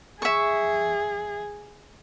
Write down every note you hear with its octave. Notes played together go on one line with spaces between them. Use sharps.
G#4 E5 C#6